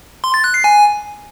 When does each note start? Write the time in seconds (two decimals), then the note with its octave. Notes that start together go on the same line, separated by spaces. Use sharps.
0.24 C6
0.34 A6
0.44 F#6
0.54 C7
0.64 G#5